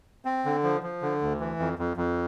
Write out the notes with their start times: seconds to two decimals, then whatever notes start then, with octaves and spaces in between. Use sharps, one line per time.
0.25 C4
0.45 D3
0.63 F3
0.83 F3
1.02 D3
1.22 D2
1.40 E3
1.59 F2
1.79 F2
1.97 F2